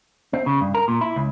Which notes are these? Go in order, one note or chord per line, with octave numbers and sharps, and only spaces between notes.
C4
C#3
G2
A#4
A#2
E4
C#2